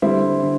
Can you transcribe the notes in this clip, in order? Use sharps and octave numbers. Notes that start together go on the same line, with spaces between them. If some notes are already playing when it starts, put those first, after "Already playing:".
D3 G3 C4 E4
D3